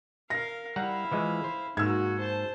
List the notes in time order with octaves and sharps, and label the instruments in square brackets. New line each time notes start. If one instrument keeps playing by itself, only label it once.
[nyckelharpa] A#4 F5 [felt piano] A#6
[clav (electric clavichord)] G3 F#5 A#5 [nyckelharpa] E4 F5
[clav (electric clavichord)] E3 F3 G#3
C5
[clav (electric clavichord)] G#2 A#3 [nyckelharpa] D#4 F#4 [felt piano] E6 G#6
[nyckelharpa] C5 A5